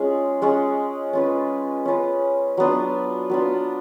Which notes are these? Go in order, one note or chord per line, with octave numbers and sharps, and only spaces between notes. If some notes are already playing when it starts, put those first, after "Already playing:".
Already playing: G#3 C#4 F4 G#4
G#3 C#4 F4 G#4
C#4 F4 B4
C#4 F4 B4
F#3 B3 D4 F4
F#3 B3 D4 F4